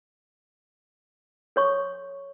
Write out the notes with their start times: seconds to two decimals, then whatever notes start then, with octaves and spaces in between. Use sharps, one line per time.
1.56 A4 C#5 C#6